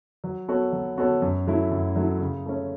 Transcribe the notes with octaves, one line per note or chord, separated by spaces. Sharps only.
F#3
B3 F#4 A4 C#5
F#3
B3 F#4 A4 C#5
F#2
F#3 A3 E4
F#2
F#3 A3 E4
C#3
A3 C#4